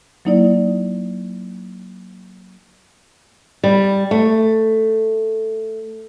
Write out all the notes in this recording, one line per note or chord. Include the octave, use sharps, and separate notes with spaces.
F#3 A#3 D#4 E4 D5
G3
A3